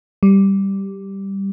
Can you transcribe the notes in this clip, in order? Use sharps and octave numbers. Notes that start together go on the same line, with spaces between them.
G3